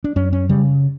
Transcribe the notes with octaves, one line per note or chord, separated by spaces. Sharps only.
D4
F#2 C#4
C#4
C#3 G3